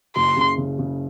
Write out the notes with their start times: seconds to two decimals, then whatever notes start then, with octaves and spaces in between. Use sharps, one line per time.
0.16 F#1 C6
0.36 C#3
0.58 C#3
0.79 C#3